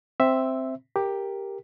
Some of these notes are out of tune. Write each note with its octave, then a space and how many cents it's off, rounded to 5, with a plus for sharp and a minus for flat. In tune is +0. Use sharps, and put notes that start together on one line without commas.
C4 +0 E5 +0
G4 +5 A#4 +0